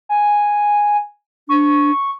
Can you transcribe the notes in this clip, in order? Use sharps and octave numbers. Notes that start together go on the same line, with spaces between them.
G#5
D4 C#6